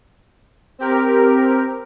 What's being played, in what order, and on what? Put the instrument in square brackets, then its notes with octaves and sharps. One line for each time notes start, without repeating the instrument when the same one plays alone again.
[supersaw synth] C4 G4 A#4